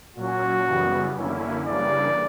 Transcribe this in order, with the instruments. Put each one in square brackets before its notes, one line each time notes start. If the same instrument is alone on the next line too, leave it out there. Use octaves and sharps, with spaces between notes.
[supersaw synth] A#2 F#3 C#4 [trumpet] F#4
[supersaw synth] F#2 C#3 E3 G3 B3
F#2 D3 A#3 C#4 E4
[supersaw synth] C#3 E3 G3 A#3 D4 [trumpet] D5